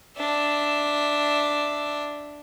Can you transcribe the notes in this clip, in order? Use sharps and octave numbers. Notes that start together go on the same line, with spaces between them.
D4 E5